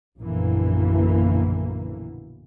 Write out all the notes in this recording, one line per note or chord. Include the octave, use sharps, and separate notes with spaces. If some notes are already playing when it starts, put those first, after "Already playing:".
A#1 F#2 B2 D3 E3 A#3